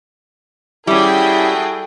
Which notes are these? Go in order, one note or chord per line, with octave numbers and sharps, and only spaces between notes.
G3 C#4 E4 F#4 G#4 A4 G5